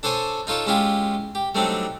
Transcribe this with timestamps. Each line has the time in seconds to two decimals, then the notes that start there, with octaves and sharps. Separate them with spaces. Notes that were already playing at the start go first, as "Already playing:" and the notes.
0.03 D4 A4 C5 C#5 G#5
0.47 D#4 F4 A4 C#5 A5
0.66 G#3 C#4 E4 F4 G4 G#4
1.35 G4
1.55 F#3 G3 A3 C4 D4 D#4